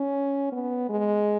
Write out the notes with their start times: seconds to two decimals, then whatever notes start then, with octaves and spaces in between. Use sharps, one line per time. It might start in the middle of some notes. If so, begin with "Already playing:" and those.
Already playing: C#4
0.52 B3
0.89 G#3